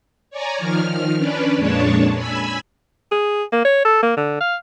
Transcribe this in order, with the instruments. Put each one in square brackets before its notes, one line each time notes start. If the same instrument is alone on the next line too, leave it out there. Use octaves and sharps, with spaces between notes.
[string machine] C#5 D5 G#5 A#5
D#3 F3 F6
C#4 D4 B4 D5
F2 A#2 G#3 D4 C#5 A5
G#5 B5 E6
[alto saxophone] G#4
A#3
C#5
A4
A#3
D3
F5